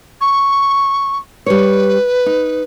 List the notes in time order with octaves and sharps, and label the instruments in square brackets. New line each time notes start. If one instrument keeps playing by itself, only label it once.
[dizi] C#6
[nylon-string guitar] G3 C#5 [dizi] B4
[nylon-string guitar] D#4